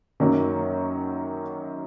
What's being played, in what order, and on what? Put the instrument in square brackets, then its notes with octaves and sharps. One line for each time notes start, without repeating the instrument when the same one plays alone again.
[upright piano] F#2 D#3 F#3 A#3 C#4